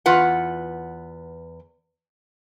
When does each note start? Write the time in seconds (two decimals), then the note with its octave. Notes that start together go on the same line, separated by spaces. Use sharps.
0.06 E2 F4 B4 F#5